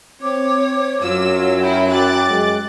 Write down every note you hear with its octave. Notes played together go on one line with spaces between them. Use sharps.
C4 C#5 D6
F#2 F#3 F4 E6
E4 A#4 G5
G5 D6 F#6 A6
G#3